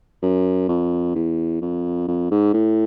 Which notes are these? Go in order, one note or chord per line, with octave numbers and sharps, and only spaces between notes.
F#2
F2
E2
F2
F2
G#2
A2